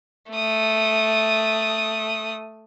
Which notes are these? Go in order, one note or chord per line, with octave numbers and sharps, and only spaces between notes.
A3 D#6